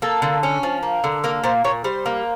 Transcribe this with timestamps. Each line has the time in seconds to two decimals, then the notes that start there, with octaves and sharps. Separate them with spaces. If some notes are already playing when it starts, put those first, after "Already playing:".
0.02 A#3 A4
0.22 D3
0.43 C#4
0.63 F3
0.83 A#3
1.04 D3
1.24 A#3 A#4
1.44 A#2 C5
1.64 A#2 C#5
1.84 G3 C5
2.06 A#3